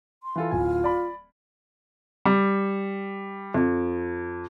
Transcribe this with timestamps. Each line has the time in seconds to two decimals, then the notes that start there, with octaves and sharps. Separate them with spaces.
0.23 C6
0.36 E3 F4 A4
0.51 D1 F4 G#5
0.84 D5 B5
2.25 G3
3.54 F2